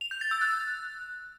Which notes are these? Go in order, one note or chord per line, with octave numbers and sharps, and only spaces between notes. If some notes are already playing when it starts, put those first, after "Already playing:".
F7
G6
A6
E6
F#6